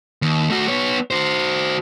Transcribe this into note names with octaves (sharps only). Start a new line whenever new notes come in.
D#2
A3 F#4
B3 C#5
F#4 C5